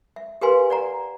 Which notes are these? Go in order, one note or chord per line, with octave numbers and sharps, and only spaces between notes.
E5
G4 A#4 B4 F5 G#5 C6
D5 F#5 A#5